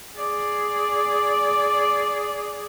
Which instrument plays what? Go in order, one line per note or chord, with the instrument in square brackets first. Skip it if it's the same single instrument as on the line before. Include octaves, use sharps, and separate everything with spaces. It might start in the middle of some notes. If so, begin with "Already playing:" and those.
[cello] G#4 D5